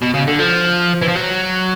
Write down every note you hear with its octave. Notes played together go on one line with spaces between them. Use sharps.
B2
C#3
D3
F3
E3
F3
F#3